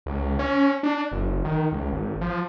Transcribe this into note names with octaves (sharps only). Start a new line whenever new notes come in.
C#2
C#4
D4
F#1
D#3
C#2
G#1
F3